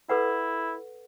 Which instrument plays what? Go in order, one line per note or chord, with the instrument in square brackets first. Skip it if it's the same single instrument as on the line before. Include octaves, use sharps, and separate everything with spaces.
[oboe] E4 [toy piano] A4 B4 F#5